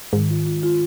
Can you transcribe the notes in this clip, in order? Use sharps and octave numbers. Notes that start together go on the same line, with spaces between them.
G#2 D#3
F4
F4
F4